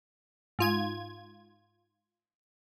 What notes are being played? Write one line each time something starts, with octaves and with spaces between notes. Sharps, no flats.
G#2 F4 G#6